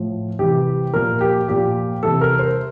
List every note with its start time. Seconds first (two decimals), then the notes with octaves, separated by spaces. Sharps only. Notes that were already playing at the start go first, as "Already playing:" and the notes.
Already playing: A2 F3
0.39 C3 E3 G3 G4
0.93 A#2 F3 A#4
1.21 G4
1.49 A#2 F3 G4
2.03 C3 E3 G3 A4
2.21 A#4
2.39 C5